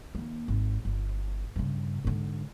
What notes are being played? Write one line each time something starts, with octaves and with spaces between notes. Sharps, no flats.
D#3 A#3
G#1
G1
G2 C#3
G#2 D3